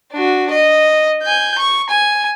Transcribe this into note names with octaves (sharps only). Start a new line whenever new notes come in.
D4 F#4
D#5
G#5 G6
C#6
G#5